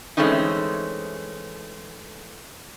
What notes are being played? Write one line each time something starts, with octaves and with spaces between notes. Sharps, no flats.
E3 G#3 A3 C4 C#4 D#4